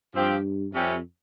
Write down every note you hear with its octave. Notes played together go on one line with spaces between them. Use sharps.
G2 F3 C4 G4
F2 C3 G3 C#4